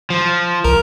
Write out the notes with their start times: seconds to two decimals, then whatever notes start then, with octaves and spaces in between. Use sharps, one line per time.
0.10 F3
0.64 C2 A#4